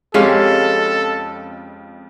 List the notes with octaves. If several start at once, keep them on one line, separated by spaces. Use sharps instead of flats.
F2 G#3 C#4 G4 A4 F5 C7